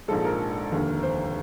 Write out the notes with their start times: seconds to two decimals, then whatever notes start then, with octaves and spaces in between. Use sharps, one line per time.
0.08 A#1 G#2 F3 G#3 A4
0.25 A#4
0.71 F1 D#2 D3
1.03 C5